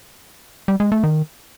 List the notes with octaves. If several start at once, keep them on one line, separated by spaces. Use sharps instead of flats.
G3
G#3
A3
D#3